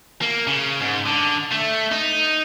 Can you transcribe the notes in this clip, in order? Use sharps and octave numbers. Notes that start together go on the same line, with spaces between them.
A#3
C#3
G#2
D3
A3
D#4